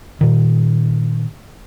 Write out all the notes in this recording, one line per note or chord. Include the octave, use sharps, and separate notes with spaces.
A#2 D#3